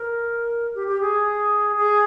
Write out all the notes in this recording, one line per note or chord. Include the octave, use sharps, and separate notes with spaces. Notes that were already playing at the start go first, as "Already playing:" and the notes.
Already playing: A#4
G4
G4
G#4
G#4